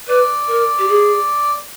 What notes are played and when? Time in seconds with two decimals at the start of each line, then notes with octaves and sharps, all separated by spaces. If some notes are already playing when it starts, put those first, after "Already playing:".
0.07 B4 D5
0.48 A#4
0.79 G4
0.88 G#4